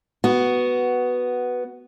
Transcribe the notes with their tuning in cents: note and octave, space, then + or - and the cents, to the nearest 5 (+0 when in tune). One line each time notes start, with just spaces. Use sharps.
B3 +0 F#4 +10